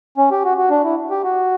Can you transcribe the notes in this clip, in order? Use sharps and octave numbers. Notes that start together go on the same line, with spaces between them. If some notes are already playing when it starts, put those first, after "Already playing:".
C#4
G4
F#4
F#4
D4
E4
G4
F#4